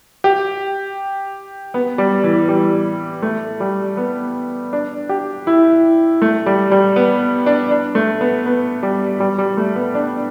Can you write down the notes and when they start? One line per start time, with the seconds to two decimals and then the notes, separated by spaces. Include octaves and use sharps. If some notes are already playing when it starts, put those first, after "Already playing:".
0.24 G4
1.74 B3
1.98 G3
2.24 E3
2.49 G3
3.22 A3
3.60 G3
3.97 B3
4.73 D4
5.09 G4
5.47 E4
6.22 A3
6.46 G3
6.71 G3
6.96 B3
7.46 D4
7.71 D4
7.95 A3
8.21 B3
8.46 B3
8.83 G3
9.20 G3
9.38 G3
9.57 A3
9.75 B3
9.95 D4